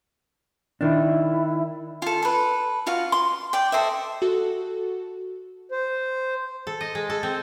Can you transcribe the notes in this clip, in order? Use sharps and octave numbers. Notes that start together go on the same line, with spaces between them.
D#3 D4 E4
F4 A4
A4 B4
F4 F#4 F5
C6
D5 G5
A4 C5 D#5 E5
F#4 A4
C5
A4
D#5
G#3
A4
C4